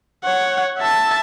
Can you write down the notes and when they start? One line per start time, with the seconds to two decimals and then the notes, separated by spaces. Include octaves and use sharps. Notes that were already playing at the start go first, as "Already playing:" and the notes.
0.24 C#5 F#5
0.79 E5 A5